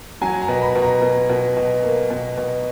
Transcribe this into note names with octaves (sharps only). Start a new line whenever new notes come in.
F#3 G#5
A#5
B2
B5
B2
A#5
B2
B2
B2
A#3
B2
B2